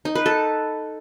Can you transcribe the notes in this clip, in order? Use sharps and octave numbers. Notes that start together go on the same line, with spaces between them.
D#4
B4
A4